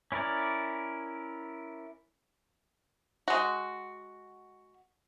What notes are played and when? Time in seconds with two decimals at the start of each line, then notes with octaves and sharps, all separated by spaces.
0.12 C#4 E4 A#4 D5
3.28 G#3 F#4